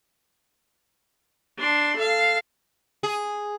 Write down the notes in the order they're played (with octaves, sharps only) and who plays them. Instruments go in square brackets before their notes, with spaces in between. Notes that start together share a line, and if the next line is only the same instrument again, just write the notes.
[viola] D4 C6
A4 F5
[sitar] G#4